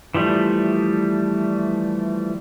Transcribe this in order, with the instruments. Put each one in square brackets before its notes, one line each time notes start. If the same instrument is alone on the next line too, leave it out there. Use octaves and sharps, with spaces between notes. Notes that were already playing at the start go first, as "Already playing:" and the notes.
[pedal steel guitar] E3 F3 G3 A3